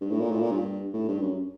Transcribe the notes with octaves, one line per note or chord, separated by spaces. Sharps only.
G2
A2
A#2
A2
A#2
G2
A2
G2
F#2